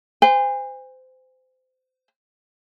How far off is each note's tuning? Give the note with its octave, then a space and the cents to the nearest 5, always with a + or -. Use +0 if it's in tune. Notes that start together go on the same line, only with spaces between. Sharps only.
C5 -25 G#5 -40